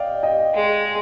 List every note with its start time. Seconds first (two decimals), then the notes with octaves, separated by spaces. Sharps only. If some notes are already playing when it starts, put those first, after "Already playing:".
Already playing: D5 D#5 F5 G5
0.23 D#5 G5
0.54 G#3